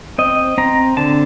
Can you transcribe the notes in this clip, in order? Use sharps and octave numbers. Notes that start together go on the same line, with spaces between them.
C4 D#5
C4 A#5
D3 A5